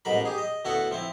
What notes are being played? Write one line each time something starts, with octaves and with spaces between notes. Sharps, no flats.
A1 G#2 B2 A#4 B5
G4 G#4
D#5
D2 B3 E4 F#4 A4 F#5
F3 C4 E4